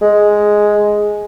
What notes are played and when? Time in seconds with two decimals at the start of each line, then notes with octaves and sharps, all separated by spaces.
0.01 G#3